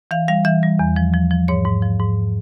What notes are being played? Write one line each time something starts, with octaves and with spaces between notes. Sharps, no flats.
E3 F5
G3 F5
E3 E5
G3
E2
F3
F3
F3
G#2 C#5
G#2
F3
G#2